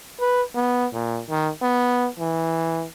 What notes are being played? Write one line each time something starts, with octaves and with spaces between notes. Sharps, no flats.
B4
B3
A#2
D#3
B3
E3